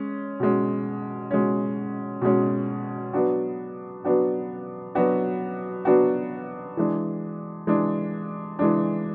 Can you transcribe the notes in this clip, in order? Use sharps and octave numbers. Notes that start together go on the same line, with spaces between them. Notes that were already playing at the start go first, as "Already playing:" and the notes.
Already playing: G#3 C#4
B2 G#3 C#4
B2 G#3 C#4
B2 G#3 C#4
F#3 B3 D4 F#4
F#3 B3 D4 F#4
F#3 B3 D4 F#4
F#3 B3 D4 F#4
E3 G#3 D4
E3 G#3 D4
E3 G#3 D4